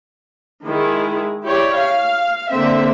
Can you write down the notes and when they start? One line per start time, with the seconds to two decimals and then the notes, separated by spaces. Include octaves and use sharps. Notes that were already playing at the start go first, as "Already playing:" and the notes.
0.66 D#3 G#3 E4 G#4
1.44 E4 G4 C#5 D5
1.76 F5
2.51 D3 A#3 C4 E5